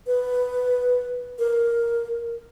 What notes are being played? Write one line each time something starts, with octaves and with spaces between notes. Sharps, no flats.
B4
A#4